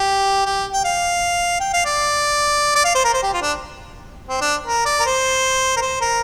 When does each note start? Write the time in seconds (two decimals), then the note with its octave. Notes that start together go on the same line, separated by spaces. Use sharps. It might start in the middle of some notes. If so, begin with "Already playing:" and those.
Already playing: G4
0.46 G4
0.72 G5
0.85 F5
1.60 G5
1.73 F5
1.86 D5
2.76 D5
2.85 F5
2.95 C5
3.05 A#4
3.14 C5
3.23 G4
3.33 F4
3.42 D4
4.29 C4
4.41 D4
4.66 A#4
4.86 D5
5.00 A#4
5.06 C5
5.77 A#4
5.81 C5
6.01 A#4